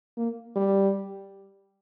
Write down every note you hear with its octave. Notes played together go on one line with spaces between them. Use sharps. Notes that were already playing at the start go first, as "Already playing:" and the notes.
A#3
G3